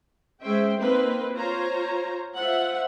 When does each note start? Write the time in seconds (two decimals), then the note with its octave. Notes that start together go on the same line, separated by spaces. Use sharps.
0.42 G#3 C#4 C5 E5 G5
0.77 A#3 C4 D#4 B4
1.34 F4 C5 C#5 A#5
2.36 F4 C5 E5 F#5